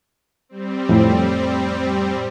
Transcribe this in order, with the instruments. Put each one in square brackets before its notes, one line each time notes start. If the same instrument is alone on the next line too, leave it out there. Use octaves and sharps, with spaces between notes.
[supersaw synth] G3 C4
[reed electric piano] F2 A2